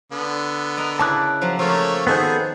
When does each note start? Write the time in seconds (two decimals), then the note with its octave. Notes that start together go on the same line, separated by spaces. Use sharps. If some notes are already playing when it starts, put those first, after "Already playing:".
0.12 D3 B3
0.77 A#4 D#5 A#5
0.99 C#3 E4 A5 D6 F#6
1.41 F3 F#3
1.59 F3 A3 A#3 G4 C#5
2.07 D#3 B3 F#4 G#4 A4 C5